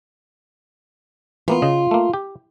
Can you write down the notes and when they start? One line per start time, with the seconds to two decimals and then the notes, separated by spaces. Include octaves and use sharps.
1.48 E3 A#3 B3 F4
1.62 C#3 D#5
1.91 A3 A#3
2.14 G4